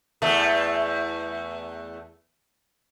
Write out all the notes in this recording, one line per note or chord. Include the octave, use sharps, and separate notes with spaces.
E2 A3